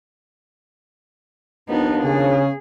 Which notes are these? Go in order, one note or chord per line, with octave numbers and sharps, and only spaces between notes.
D#2 F3 B3 D4 D#4
C#3 G#4